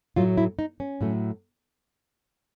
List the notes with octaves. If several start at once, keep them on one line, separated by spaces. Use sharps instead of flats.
A2 F#3 A3 F4
E4
D#4
C#4
A2 F#3 A3